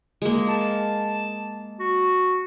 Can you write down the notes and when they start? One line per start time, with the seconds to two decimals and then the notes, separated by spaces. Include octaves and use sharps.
0.22 G#3 A#3
0.49 A5
1.80 F#4